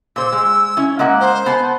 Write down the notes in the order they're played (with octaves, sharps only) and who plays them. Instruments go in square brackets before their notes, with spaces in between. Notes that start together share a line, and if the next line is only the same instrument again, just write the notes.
[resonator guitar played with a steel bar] A#2 C5 [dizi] E6
[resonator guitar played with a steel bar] G#3
C#4 E4
G#3 A#3 F#5
[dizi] C5
[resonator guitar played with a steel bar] B3 G#5 A5